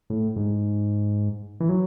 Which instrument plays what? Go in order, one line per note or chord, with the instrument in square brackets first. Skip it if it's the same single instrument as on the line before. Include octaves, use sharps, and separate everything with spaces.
[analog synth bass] A2
G#2
E3
F#3